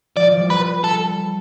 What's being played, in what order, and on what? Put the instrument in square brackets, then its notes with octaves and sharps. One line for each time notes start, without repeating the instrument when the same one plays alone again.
[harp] F3 [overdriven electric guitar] D5
[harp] F3
G3
[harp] G3 [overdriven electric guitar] B4
[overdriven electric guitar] A4